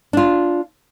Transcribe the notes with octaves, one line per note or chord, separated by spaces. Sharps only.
D4 F4